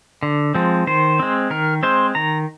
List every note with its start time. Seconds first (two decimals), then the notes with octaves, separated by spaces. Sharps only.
0.23 D3
0.54 F3 G#3 C4
0.87 D#3 C5
1.19 G#3 C4
1.50 D#3 A#4
1.83 G#3 C4 C5
2.15 D#3 A#5